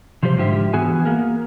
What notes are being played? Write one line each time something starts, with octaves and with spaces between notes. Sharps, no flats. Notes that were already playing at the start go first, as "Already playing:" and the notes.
C3 F3 G3 G4 C5
G#2 D3 F3 G4 E5
E3 B3 F#4 G#4 G#5
A#3 A#4